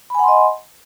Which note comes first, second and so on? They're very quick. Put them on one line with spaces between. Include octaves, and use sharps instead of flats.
B5 G#5 F#5 C6 D#5